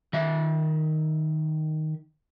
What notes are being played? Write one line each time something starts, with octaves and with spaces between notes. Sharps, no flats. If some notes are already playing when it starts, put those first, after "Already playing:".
D#3 E5